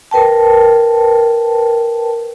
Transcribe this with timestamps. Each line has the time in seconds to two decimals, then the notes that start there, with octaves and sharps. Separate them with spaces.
0.11 A#4 B4 G5 A5